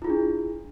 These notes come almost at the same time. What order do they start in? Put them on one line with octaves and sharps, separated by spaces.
E4 F4 G#4 D4